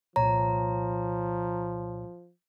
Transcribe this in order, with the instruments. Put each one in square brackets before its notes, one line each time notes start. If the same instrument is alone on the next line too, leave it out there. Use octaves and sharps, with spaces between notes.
[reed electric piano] C2 A#2 C#5 [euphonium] F3 [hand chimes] A#5